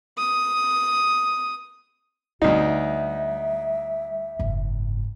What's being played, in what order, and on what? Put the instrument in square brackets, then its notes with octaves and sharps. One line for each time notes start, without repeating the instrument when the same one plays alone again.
[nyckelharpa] D#6
[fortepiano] D2 D#4 [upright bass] G3 [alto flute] F#4
[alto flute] E5
[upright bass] F#1 G#2